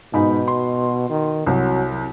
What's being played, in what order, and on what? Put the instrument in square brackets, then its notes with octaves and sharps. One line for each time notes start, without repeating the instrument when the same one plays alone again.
[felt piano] G#2 D#4 B5 [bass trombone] B2
[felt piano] C6
[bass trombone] D#3
[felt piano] C2 [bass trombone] F#3